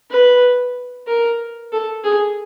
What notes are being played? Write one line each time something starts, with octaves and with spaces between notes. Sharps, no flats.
B4
A#4
A4
G#4